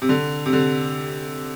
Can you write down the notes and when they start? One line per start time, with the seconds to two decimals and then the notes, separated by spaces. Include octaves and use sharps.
0.02 C3
0.09 D3
0.46 C3
0.53 D3